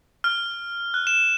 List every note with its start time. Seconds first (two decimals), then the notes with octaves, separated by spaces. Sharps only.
0.24 F6
0.94 F#6
1.07 E7